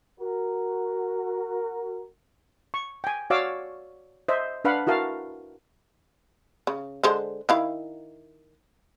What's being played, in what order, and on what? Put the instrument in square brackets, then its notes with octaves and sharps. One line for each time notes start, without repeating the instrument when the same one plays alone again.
[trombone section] F#4 A#4
[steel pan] C#6
G5 G#5
F#4 C#5 D5 F5 D6 E6
C5 D#5 E5
D4 B4 F5 F#5 B5
E4 F#4 A#4 F5 A5
[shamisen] C#3
D3 G#3 C5
D#3 E4 F5